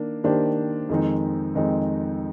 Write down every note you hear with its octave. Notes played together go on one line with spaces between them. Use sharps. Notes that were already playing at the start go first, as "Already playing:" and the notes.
Already playing: D#3 A#3 D4
D#3 A#3 D4 G4 C5
F2 D#3 G#3 C4 D#4
F2 D#3 G#3 C4 D#4